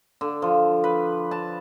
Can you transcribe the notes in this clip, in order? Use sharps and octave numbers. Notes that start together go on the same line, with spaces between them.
D3
F3
B4
A5